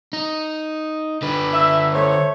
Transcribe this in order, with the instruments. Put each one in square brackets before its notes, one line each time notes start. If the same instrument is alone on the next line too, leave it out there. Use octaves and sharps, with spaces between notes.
[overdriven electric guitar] D#4
D3 B4
[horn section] E5
A3 C5 C#5